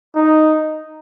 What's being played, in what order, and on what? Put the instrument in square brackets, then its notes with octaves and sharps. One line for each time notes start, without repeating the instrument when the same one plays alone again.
[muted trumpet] D#4